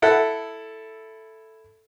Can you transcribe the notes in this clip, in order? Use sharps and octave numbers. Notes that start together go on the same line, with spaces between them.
E4 A4 F#5